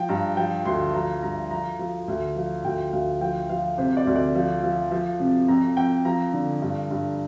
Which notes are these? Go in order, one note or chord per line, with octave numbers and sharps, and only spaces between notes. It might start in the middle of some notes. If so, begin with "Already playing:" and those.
Already playing: F3 G5
G2 A#5
F3 G5
D2 C6
F3 A#5
G2 A#5
F3 A#5
F3
D2
F3
D2 G5
D2 F5
F3 G5
F3 F5
C3 C5
D5
D2
D5
F3
F3
F3
C3
F2 A#5
F2 G5
F3 A#5
D3
G2
G2